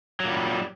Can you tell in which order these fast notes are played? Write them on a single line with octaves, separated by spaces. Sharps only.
F#3 A#2 G3